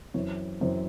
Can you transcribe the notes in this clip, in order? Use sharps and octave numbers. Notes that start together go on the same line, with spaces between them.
F#2 E3 C4 C#5
F#2 E3 C4 C5